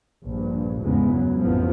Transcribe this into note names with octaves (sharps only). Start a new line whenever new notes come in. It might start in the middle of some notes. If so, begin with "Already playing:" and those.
A#1 G2
G1 E2 G#2 C#3 G#3 B3
F#2 F#3
A1 F2 A2 F3 B3